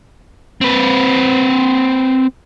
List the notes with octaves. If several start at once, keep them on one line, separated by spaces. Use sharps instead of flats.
C4 B4